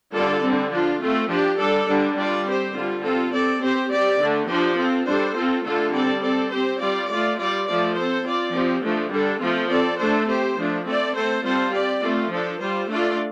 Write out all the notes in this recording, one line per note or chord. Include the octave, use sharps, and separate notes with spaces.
D3 G3 F4 A4 D5
D3 G3 C4
F3 D4 F4
A3 C4 F4
F3 D4 G4
G3 D4 A4 D5
D3 G3 D4
G3 D4 F4 D5
C4 G4 C5
D3 G3 F4
C4 F4 A4
C4 A4 D5
C4 G4 C5
C4 G4 D5
D3 A3 D4
F3 D4 G4 C5
C4 F4 A4
G3 D4 A4 C5
C4 F4 A4
D3 A3 F4 A4
G3 C4 A4 D5
C4 A4 D5
C4 G4 C5
G3 F4 D5
A3 F4 D5
G3 F4 D5
F3 A3 F4 D5
C4 A4 C5
C4 F4 D5
F3 C4 G4
F3 A3 D4
D3 G3 D4 A4
F3 A3 C4 F4
C4 A4 D5
A3 D4 A4 C5
C4 G4 C5
F3 A3 D4
A3 C4 A4 D5
A3 C4 A4 C5
G3 C4 F4 A4 C5
C4 G4 D5
A3 C4 F4
F3 D4 A4
G3 F4 C5
A3 D4 F4 D5